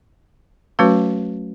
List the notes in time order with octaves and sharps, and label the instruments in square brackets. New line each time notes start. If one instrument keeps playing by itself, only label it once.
[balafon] F#3 A3 C#4 F#4 B4